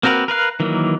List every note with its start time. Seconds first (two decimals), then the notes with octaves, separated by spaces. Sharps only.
0.03 A#3 C4 F#4 A#4 B4
0.28 A#4 B4 F5 F#6
0.60 D#3 E3 F#3 A#3